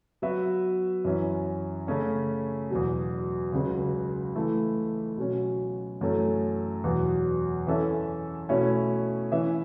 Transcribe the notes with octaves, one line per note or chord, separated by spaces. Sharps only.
F#3 B3 F#4 B4 E5
F#2 E3 C#4
C#3 A3 C#4 A4 C#5
E2 B2 F#3
C#2 C#3 F#3
E3 A3 E4
B2 F#3 C#4
F#2 E3 A3 C#4 A4
E2 B2 F#3 B3
E3 C#4 A4 E5
B2 A3 C#4 E4 C#5
E3 C#4 E4 B4 E5